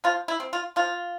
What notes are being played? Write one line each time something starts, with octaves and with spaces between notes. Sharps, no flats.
F3 F4
E4
C4
F4
F3 F4